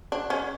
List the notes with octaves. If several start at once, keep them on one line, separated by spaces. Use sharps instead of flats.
D4
C#4